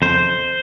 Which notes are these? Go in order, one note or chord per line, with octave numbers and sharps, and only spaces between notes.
F2 C5